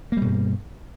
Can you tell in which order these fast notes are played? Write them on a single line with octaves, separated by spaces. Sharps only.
A#3 G3 B2 G2